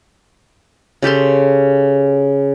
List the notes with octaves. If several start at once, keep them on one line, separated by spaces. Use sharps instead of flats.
C#3 G4 A4 C6